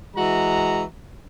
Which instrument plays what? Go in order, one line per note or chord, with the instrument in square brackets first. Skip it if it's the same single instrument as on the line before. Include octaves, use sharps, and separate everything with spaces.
[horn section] E3 G#3 F#4 A#5